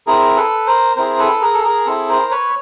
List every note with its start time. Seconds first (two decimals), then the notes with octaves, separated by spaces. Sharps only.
0.07 C4 E4 G#4 A#4
0.36 A4 B4
0.67 A#4 C5
0.96 C4 E4 G#4 A#4 C5
1.19 A4 B4
1.41 G#4 A#4
1.54 A4
1.64 G#4 A#4
1.86 C4 E4 G#4 A4
2.09 A#4 C5
2.31 B4 C#5